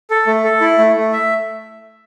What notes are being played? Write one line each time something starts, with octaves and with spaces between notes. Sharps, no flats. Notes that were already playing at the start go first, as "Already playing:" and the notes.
A4
A3
A4
E4
A3
A3
E5